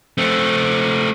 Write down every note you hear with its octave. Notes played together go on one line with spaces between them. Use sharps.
A3 C4